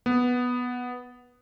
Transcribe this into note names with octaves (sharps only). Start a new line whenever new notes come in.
B3